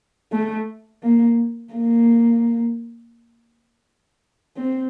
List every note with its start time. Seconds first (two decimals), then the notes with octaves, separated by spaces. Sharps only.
0.32 A3
1.03 A#3
1.74 A#3
4.57 C4